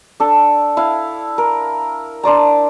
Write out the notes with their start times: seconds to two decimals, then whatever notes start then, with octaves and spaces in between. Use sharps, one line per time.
0.20 D4 A4
0.77 E4 F5
1.38 A#4
2.23 D4 C5 D5 A#5